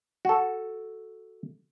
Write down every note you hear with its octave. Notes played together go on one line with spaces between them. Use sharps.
F#4 A4